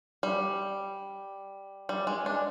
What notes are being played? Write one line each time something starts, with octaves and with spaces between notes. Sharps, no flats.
G3
G3
G#3
D4